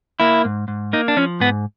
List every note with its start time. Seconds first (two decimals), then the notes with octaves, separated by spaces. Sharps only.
0.20 A#3 E4
0.45 G#2
0.68 G#2
0.93 A#3 D#4
1.08 D4
1.17 F3 C#4
1.40 G#2 B3